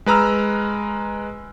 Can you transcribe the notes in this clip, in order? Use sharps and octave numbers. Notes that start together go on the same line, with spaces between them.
G#3 B4 A#5 E6 F6